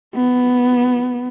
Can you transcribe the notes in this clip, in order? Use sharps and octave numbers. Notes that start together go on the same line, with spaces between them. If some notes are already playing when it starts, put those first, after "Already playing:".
B3